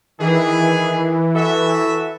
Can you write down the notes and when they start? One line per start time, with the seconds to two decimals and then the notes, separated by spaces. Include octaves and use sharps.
0.20 D#3 E3 G#4
1.36 F#4 A4 E5